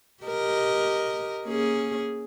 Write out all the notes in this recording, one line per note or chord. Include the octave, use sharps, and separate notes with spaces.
G4 A#4 D#5
A#3 C#4 G#4